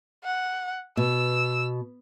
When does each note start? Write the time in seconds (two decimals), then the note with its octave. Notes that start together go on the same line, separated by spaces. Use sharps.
0.24 F#5
0.97 B2 E6